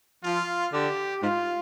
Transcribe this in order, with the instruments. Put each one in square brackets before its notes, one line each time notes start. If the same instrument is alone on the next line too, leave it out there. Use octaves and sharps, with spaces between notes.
[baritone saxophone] F3 [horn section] F4
[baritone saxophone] D3 [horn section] G4
[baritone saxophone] G#2 [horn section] F4